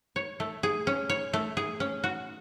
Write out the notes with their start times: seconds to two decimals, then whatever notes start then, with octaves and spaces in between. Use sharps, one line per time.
0.16 C#5
0.40 A3
0.63 G#4
0.87 C#4
1.09 C#5
1.33 A3
1.57 G#4
1.80 C#4
2.04 F#4